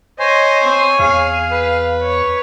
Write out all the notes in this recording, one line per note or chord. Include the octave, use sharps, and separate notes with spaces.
C5 C#5 D#5 G#5
C4
E2 G#4 F5
B4
C#5